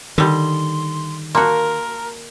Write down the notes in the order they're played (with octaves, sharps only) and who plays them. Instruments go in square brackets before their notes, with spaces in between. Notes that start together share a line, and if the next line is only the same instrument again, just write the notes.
[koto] D3 G3 [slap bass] D#3 [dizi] C6
[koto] A#3 F#4 [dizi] A#4 [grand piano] A5 A#5 C6